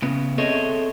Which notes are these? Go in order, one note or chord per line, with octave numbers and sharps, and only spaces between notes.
C#3 B3
C4 G#4 A4 C#5 D#5 E5